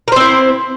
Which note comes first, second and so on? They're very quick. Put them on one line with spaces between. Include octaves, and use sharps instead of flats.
A#4 C5 C4 E4